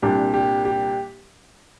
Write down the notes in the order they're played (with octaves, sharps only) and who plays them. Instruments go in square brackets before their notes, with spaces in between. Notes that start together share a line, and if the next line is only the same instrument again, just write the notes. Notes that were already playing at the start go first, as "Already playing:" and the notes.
[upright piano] C2 A#2 G3 D4 [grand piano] G4
[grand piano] G4
G4